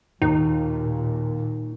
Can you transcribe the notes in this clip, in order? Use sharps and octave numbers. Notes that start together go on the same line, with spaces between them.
D#2 A#2 D#4